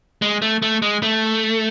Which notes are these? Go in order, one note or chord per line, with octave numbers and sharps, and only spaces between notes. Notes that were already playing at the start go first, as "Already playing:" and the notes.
G#3
A3
A3
G#3
A3